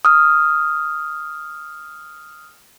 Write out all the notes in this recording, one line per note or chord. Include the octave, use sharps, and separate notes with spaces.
D#6 F6